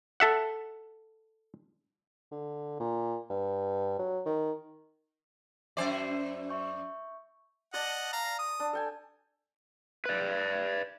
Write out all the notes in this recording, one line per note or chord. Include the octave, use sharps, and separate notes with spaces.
A4 E5 F#5
D3
A#2
G2
F#3
D#3
F#2 C5 D5 E5 G#5
E5 C#6 G6
D5 D#5 F#5 A5
F5 A#5
D#6
D4
A4 G5 G#5
B4 D5